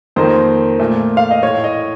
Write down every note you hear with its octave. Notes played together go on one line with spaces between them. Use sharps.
F2 D#3 A#3 C5
A#2 A3
F5
D#5
A2 A3 C#5
D#5